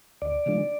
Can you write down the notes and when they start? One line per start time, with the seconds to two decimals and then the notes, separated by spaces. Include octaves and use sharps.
0.22 D2 D5
0.46 C#3 F3 G#3 D4